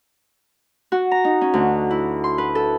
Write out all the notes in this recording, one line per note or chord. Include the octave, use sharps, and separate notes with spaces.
F#4
A#5
D#4
C#4
D2
E4
C6
B4
A4